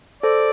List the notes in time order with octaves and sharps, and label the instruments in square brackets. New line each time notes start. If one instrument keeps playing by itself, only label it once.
[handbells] A4 C5 [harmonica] D5